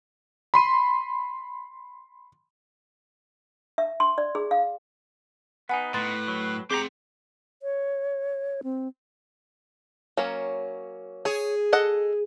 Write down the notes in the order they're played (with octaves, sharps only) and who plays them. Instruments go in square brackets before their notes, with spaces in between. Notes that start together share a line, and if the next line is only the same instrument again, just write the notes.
[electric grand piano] B5 C6 D#7
[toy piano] E5
C6
D5
G#4
F5
[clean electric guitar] B3 D#4 [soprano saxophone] B4 [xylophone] F#5 G#5
[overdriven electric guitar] A2 [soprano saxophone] B4 [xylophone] C6 A6
[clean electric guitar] F#3
[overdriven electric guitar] C4 F#5 [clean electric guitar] G4 G5 A#5 [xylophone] G#4 [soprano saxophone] D6
[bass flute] C#5
C4
[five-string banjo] F#3 A#3 C#4
[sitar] G#4 [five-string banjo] C#5
[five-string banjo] A4 D#5 F#5